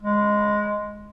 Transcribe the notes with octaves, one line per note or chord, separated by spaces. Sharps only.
G#3